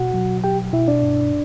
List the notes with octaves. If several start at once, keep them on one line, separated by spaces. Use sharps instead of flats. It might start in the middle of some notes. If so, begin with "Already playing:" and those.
Already playing: B2 F#4 F#5
F#3
B2 G4 G5
B2 E4 E5
D4 D5
G2